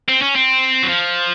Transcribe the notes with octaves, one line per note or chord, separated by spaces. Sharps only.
C4
C#4
C4
F#3
F3